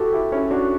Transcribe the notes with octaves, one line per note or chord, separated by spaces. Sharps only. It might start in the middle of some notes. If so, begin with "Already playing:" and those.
Already playing: E4 F#4 G4 A4
E4 G4
C#4 E4
D4 F#4